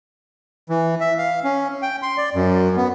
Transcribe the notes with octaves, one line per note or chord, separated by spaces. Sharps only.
E3
E5
F5
C#4
G5
C6
D5
F#2
B3